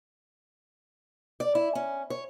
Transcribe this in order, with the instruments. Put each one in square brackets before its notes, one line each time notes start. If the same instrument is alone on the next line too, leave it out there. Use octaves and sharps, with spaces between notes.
[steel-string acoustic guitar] D5
E4
C#4
C#5